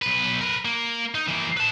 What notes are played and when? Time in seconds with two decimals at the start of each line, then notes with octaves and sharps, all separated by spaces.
0.02 B1 B4
0.41 A#4 B4
0.65 A#3
1.15 D#4
1.28 E3 A#3
1.57 B4 A5